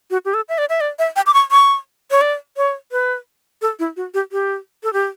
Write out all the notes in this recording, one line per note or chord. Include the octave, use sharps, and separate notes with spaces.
F#4
G4
A4
E5
D5
E5
D5
E5
G5
D6
C#6
C#6
C#5
D5
C#5
B4
A4
E4
F#4
G4
G4
A4
G4